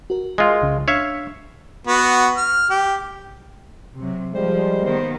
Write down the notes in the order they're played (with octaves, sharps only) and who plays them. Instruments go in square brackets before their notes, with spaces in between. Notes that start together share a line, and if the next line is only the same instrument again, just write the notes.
[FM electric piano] F#4 A#4
[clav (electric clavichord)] G#3 F4
[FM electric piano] C2 C#3
[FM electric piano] D4 [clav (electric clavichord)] C#5 E5 F5
[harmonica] B3 F#4
F6
G4
[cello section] C3 F#3
[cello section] F3 [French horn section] G3 G#3 [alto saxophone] C5
[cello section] D#3 A#3 B3 [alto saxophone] C5